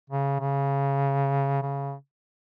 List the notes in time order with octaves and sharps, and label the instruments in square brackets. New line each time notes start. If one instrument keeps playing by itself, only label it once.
[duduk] C#3
C#3
C#3